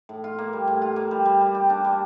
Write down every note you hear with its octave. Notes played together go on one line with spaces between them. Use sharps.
A2
F4
A#3
G3
A2
F4
A#3
G3
G3
G3
G4
D4
G3